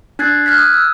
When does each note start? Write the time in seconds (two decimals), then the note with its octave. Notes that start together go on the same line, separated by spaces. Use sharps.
0.19 D4 F#6 G#6 A6 C7
0.46 F6 F#6 G#6 B6
0.58 D#6
0.74 E6